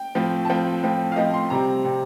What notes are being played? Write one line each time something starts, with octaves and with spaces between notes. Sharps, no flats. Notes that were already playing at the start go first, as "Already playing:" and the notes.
Already playing: G5
A2 F3 C4
A5
A2 F3 C4 G5
A2 F3 C4
F5
A2 F3 C4 D#5
C6
C3 G3 C4 A#5
C3 G3 C4